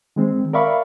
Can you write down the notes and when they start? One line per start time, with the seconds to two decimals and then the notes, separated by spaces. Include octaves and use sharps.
0.16 D#3 G#3 C4
0.53 A#4 D5 E5 F5 B5 C#6